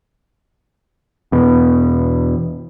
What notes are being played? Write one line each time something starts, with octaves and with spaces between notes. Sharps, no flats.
E2 B2